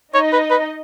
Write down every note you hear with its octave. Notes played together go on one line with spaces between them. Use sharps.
D#4 C#5 D#5
B4
B4